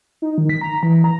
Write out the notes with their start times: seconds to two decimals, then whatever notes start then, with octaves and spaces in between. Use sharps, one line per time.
0.22 D#4
0.38 D#3
0.50 B6
0.61 A#5
0.83 E3
1.04 A#5